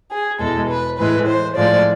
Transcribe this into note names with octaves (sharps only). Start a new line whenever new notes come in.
G#4
E2 B2 G#3 A4
B4
A2 E3 G#3 B4
C5
A2 F3 G#3 D5